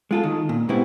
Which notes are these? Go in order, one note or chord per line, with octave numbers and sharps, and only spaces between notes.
G#3 F4 A4
D#3
A#2
G#2 B2 B3 C4 E4 G4